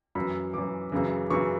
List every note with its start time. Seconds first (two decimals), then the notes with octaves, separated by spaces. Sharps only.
0.15 F#2 E3 B5
0.53 F#2 E3 D6
0.92 F#2 C#3 E3
1.30 F#2 C#3 E3 C#6